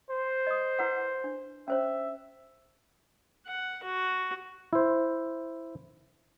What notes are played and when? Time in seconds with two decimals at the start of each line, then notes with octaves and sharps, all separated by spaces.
0.10 C5
0.47 D#5 D#6
0.79 E4 B4 F#5
1.24 D4
1.68 C#4 C5 C#5 E5
3.47 F#5
3.83 F#4
4.73 E4 C5